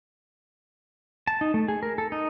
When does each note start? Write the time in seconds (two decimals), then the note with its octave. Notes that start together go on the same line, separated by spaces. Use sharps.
1.27 A5
1.41 D#4
1.54 A3
1.68 G#4
1.83 A#4
1.98 A4
2.12 D#4